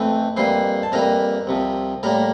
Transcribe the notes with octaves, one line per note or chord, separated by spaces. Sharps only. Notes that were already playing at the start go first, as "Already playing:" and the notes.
Already playing: F2 E3 A3 C4
F2 E3 G3 A#3 C5 C6
A5
F2 E3 G3 A#3 A#4 A#5
C2 C3 F3
A2 G3 A#3 A#4 A#5